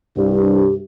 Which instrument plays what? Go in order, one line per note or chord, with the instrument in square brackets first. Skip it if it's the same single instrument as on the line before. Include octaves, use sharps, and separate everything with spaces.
[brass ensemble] C2 G2 [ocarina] G4